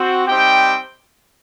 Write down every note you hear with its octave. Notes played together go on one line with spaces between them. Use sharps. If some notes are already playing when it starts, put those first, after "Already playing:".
Already playing: C4 F#4
G3 C4 D#4 G4 G5